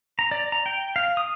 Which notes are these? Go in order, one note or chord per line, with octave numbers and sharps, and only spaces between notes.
A#5
D5
A#5
G5
F5
D#6